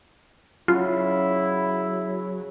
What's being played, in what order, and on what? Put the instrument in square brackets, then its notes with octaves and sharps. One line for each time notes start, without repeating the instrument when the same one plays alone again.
[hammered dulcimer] C#3 [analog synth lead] F#3 [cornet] E4 [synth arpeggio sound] F4